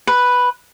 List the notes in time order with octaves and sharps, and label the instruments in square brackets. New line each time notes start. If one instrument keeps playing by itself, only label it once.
[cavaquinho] B4